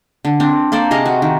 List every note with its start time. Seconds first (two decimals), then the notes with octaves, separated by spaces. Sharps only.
0.25 D3
0.40 C4 D4
0.72 A#3 A4 C5 D5
0.91 C3 G#4 D#5 F5
1.06 F#4
1.22 D#3